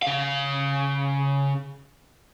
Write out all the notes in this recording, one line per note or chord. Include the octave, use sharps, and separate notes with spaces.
C#3 F5